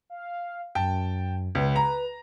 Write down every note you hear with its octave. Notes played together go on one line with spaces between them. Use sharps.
F5
F#2 G5 A5
C#2 B4
A#5